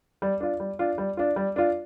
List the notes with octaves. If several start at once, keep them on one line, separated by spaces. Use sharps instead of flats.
G3
D4 F4
G3
D4 F4
G3
D4 F4
G3
D4 F4